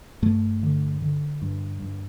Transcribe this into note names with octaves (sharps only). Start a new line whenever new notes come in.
G2 A3
D3
D3
G2
G2